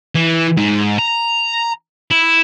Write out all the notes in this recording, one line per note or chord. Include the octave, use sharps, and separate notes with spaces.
E3
G#2
A#5
E4